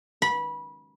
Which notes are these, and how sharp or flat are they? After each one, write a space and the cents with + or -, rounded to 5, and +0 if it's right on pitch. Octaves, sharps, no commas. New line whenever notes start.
B5 -20